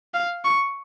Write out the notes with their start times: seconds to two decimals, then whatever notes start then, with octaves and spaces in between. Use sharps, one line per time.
0.14 F5
0.45 C#6